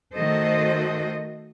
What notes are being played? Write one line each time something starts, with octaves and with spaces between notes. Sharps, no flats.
D#3 A3 F#4 A4 C5 D#5